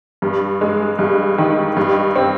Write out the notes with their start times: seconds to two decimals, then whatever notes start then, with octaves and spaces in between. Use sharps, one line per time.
0.22 G2
0.61 G#3
0.99 G2
1.38 D#3
1.77 G2
2.16 C4